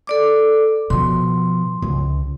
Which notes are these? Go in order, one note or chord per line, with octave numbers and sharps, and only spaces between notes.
A4 D5 D6
B2 F3 C6
C#2